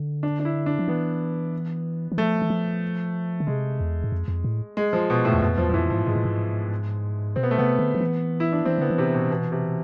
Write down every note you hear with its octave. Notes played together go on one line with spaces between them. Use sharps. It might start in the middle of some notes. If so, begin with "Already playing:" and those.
Already playing: D3
D4
D4
E4
D4
F3
E3 B3
E3
F3 A3
E3
F3
D3
C3 G#3
E2
G#2
F2
F2
A2
G#3
F3
B2
A2
E2
F2 B2
E2 F3
F3
F2 E3
G#2 F3
G#2 G#3
A2
G#2
B2 C4
B3
A3
C3 B3
D3
F3
E3
E4
D4
E3 C4
D3 B3
E3
C3
B2
B2
C3